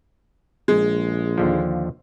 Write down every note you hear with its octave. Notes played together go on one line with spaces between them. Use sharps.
A#1 G#3
D#2 D3 F3